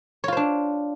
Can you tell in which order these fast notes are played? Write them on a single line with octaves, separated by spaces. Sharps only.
C#5 F4 C5 D4